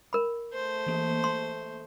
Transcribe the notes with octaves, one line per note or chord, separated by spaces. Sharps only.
A#4 B5
A3 C5
E3 A#3
C6